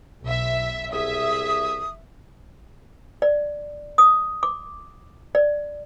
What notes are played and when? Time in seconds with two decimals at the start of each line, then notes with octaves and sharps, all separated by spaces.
0.22 B1 E5
0.93 C2 G#4 E5 D#6
3.22 D5
3.98 D#6
4.43 D6
5.35 D5